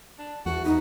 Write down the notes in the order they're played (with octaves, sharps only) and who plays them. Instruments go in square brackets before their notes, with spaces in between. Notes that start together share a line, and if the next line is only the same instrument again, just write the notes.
[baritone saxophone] D4
[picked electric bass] E2 [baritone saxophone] F#4
[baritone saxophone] B3 [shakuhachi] D#4